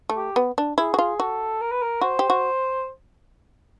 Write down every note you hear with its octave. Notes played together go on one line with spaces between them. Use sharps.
A3
G4
B3
D4
E4 G#4
F#4
F4
F#4 A4
A#4
B4
A#4
F#4 C5
G4
F#4